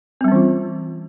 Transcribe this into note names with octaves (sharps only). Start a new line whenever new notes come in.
E3 G3 C4 C#4 F4